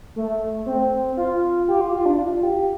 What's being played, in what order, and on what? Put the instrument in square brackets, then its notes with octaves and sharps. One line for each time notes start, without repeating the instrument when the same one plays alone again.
[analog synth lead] A3
C4
F4
G4
F4
F4
D4
F4
G4